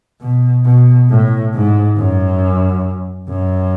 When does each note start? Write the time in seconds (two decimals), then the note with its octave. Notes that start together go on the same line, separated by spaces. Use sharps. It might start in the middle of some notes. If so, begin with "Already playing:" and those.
0.22 B2
0.65 B2
1.09 A2
1.54 G#2
1.97 F#2
3.29 F#2